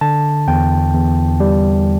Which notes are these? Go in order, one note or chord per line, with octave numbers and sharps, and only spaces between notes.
D3 A5
E2 G5
E2
G3